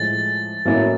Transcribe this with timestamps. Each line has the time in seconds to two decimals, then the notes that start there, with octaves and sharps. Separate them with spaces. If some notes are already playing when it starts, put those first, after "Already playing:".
Already playing: A2 F3 G#3 A6
0.65 A2 F#3 A#3 C#4 E4